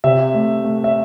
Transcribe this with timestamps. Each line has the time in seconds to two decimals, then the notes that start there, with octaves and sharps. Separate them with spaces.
0.04 C3 E5
0.34 A3
0.64 A3
0.84 E5